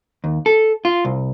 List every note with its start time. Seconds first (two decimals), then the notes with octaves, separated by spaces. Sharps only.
0.24 D#2
0.46 A4
0.85 F4
1.05 C2